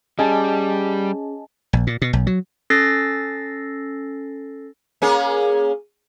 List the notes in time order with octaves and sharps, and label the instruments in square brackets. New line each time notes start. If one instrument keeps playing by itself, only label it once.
[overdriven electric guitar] G3 [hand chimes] C#4 G#4 [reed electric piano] D#5 G#5 A5
[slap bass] A#1
A#2
B2
B1
F#3
[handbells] C#4 A4 E6 A6 A#6 C7
[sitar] A#3 C#4 G#4